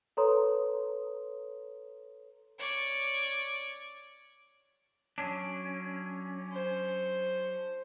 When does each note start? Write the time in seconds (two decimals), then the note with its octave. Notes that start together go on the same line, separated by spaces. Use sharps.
0.17 A4 B4 C#5 A#5 C6 D#6
2.59 C#5 D5
5.18 F#3 C#4 D4
6.52 C5